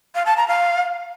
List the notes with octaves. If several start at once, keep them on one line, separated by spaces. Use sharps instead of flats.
F5
A5
A#5
F5